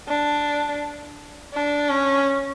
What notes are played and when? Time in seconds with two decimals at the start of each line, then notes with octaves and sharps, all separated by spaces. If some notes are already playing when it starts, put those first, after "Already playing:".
0.08 D4
1.54 D4
1.89 C#4